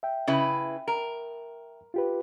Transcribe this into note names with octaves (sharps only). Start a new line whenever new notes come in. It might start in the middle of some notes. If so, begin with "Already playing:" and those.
E5 G5
C#3 E4 B4
A#4
F4 G4 B4